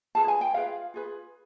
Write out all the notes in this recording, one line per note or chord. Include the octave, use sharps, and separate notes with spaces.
F4 G#4 B4 A5
G#5
G5
F4 G#4 B4 F5
F4 G#4 B4